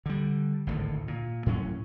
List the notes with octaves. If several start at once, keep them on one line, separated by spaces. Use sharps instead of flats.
D3 G3
G#1 D2 A2
A#2
A2 F#3 C#4